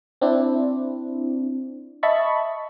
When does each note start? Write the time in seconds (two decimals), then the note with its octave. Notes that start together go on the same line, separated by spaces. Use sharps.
0.22 C4 D4 E4
2.03 D#5 E5 A5 B5 C#6